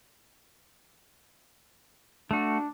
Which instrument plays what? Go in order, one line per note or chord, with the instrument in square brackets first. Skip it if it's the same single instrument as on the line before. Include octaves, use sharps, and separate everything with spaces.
[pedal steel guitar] A3 F#4 [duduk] D4